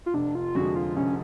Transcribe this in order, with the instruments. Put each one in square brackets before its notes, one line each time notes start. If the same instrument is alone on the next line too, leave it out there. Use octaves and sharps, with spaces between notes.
[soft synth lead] F4
[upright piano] F1 [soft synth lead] D4
[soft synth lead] F4
[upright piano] F2 D3 F3 G#3 [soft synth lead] F#4
[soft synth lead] F4
[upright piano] F1 [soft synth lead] C#4